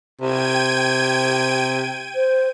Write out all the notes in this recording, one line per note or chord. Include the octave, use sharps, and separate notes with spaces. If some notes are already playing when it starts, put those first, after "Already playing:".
C3 G5 G#6 D#7
C5